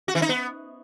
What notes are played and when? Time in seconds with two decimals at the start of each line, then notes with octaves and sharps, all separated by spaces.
0.08 F#4
0.15 E3
0.22 D#4
0.29 B3